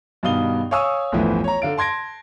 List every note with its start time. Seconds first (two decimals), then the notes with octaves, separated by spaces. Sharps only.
0.23 G2 B2 D#3 F5 D#6 G7
0.71 C#5 F5 G#5 C#6 D#6 E6
1.12 G1 D2 A2 E3 F3
1.44 C#5 A#5
1.62 D3 F5 D7
1.78 A5 C6 G#6 A#6 D7